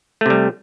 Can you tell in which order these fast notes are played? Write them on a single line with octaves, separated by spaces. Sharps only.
A3 C3 G3